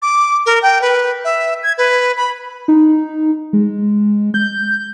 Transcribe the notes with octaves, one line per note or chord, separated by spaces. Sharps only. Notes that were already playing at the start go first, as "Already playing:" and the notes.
D6
A#4
G5
B4
E5
G#6
B4
B5
D#4
G#3
G6